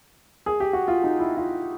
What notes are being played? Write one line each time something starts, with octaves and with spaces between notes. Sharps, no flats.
G#4
G4
F#4
F4
D#4
E4
F4